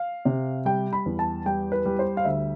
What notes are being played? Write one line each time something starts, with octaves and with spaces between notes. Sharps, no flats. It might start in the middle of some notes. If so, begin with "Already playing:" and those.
Already playing: F5
C3
G3 G5
B5
E2
A5
G3 G5
B4
G3
C5
F5
D2 E5